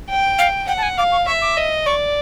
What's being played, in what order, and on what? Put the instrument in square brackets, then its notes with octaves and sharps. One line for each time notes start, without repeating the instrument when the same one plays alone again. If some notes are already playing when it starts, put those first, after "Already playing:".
[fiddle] G5
[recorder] F5
[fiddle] F#5 [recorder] G5
[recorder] A5
G#5
[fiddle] F5 [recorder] D6
[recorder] C#6
[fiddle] E5 [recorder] C#6
[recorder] D6
[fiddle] D#5
[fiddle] D5 [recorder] C#6